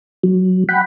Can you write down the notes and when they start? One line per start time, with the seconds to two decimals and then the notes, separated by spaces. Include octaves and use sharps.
0.23 F#3
0.69 F#5 G5 B5